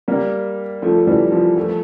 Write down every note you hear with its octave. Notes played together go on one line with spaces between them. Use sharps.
G3 A#3
F3 A3
A3
E3 G3
F3
F3 A3